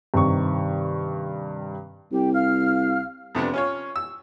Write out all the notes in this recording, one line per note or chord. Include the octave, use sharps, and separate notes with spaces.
G2 C3 D#3 C#6
C2 G4
F5 F6
F2 C3 B3 D4
C#4 F4 C#5
E6